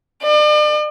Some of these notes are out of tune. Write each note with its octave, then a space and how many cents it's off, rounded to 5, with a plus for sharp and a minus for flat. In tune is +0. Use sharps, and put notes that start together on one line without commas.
D5 +40